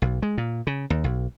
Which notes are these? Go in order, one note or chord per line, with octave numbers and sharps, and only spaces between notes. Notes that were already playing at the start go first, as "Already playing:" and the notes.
B1
G#3
A#2
C#3
D#2
B1